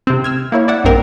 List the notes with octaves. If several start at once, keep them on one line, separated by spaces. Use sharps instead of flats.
C3 C4
E6 F6 G#6
A#3 E4 C#5
D5 E5 F#5
A#1 G2 C4 A#4